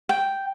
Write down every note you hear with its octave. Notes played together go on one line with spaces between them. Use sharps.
G5